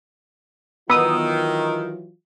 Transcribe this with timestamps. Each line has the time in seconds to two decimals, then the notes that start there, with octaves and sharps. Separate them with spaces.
0.90 D#3 E3 F#3 B3 F4 D#6 E6